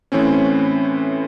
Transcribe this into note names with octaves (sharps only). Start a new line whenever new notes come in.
A2 E3 C4 C#4